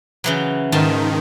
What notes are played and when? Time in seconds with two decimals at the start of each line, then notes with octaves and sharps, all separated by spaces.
0.24 C#3 E3 F#3
0.72 G#2 D#3 F4 A5